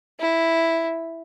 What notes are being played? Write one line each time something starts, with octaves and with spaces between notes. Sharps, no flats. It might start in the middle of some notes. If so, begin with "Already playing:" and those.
E4